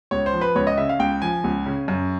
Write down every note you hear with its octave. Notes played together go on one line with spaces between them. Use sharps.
C#2 C#5
C5
F3
B4
C#2 C#5
D#5
C#3 E5
F5
C#2 G5
F3 G#5
C#2
C#3
F#2